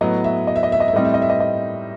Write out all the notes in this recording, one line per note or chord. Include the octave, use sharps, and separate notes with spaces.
A2 F#3 B3 D#5
E5
D#5
E5
D#5
E5
D#5
E5
A2 G3 C4 D#5
E5
D#5
E5
D#5
D#5